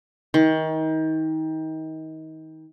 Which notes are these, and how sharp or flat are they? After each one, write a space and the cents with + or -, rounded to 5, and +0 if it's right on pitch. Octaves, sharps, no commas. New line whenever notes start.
D#3 +30